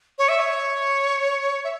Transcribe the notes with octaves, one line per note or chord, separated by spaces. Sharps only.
C#5
E5
C#5
E5